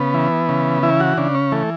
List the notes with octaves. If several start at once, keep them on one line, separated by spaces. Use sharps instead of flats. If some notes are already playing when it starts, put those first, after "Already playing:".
Already playing: C#3 B3
E3
C#3
E3 E4
F#4
C#3 D4
C#4
E3 A3